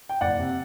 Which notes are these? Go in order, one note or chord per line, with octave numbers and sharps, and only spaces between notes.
G5
F#1 D5 F#5
C3